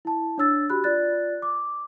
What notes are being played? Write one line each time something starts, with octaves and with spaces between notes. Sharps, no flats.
E4 A5
D4 C#5 E6 A6
F#4 G4 B5 F#6
F4 D5 F#6 A6
D6